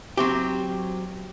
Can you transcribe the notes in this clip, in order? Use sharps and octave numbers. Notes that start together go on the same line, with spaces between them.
F#3 C4 G4